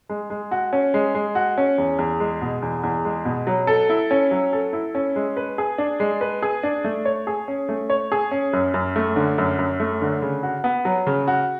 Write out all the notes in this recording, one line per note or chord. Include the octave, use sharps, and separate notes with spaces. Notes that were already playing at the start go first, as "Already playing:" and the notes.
G#3
G#3
F#4
C#4
G#3
G#3
F#4
C#4
E2
E2
G#3
B2
E2
E2
G#3
B2
F#3
A4
E4
C#4
F#3
A4
E4
C#4
G#3
B4
G#4
D4
G#3
B4
G#4
D4
A3
C#5
G#4
C#4
A3
C#5
G#4
C#4
F#2
F#2
A3
D3
F#2
F#2
A3
D3
C#3
F#4
B3
F#3
C#3
F#4